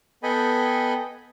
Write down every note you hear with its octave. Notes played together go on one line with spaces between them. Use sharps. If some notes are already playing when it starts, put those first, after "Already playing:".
B3 A4 D#5 G5 G#5 B5